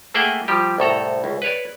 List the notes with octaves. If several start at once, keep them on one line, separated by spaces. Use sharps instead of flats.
A3 A#3 G#4 E5 F#5 G5
F3 G3 G4
C2 A2 A4 A#5
C#2
B4 C#5 D5